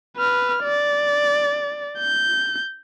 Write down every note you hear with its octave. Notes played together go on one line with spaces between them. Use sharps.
B4 F6
D5
G6